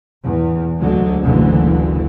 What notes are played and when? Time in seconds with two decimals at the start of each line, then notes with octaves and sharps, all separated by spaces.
0.23 E2
0.78 D2 D3 F#3 G#3
1.24 F#1 D2 A#2 D3 E3